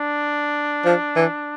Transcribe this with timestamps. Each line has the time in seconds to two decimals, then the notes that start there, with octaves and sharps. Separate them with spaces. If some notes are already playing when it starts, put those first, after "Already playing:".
Already playing: D4
0.85 F3
1.16 E3